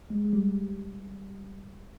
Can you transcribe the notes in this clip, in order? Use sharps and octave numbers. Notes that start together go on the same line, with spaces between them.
G#3
G#3
G3